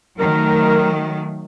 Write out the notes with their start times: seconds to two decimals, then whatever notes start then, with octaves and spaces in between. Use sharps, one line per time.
0.19 D#3 F#3 A3 A#4